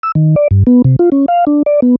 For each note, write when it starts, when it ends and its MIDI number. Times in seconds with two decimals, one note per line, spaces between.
0.03 0.12 88
0.15 0.35 51
0.36 0.48 74
0.51 0.63 43
0.67 0.82 59
0.85 0.96 48
0.99 1.10 65
1.12 1.26 61
1.28 1.45 77
1.47 1.63 62
1.66 1.80 74
1.82 1.96 59